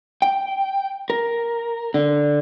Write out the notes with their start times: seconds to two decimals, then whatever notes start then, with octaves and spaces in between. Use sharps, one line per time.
0.22 G5
1.10 A#4
1.94 D3